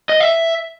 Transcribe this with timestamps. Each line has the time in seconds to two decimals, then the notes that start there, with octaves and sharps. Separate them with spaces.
0.09 D#5
0.20 E5